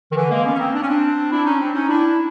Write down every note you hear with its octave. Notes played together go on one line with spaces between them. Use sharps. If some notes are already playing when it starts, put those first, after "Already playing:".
D#3
D3 E3
G#3 A#3
B3 C#4
C#4
A#3 C4
D4
C#4
C4 D4
D4 E4
C#4 D#4
C4 D4
C#4 D#4
D4 E4
D4